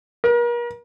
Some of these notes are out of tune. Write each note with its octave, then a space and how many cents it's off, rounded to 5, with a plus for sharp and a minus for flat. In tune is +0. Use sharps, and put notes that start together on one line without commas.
A#4 +40